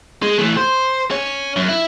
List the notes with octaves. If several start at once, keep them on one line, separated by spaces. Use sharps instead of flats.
G#3
E3 A3
C5
C#4 C#5
F#2
E4